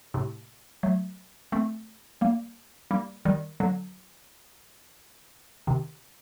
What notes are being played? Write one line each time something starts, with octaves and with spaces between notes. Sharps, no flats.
A2 C3
F#3 A3
A3 C4
G3 A#3
G3 A#3
D#3 G3
D3 F#3
C3 D#3